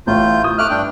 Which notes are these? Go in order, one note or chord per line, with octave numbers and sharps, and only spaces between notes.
A1 A3 F4 G6
D#6 G6
A3 E5 D6 F6 F#6
G2 D4 G5